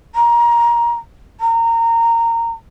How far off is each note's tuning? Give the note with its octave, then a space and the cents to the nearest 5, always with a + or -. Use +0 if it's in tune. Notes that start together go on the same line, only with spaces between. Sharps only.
A#5 +20
A#5 -20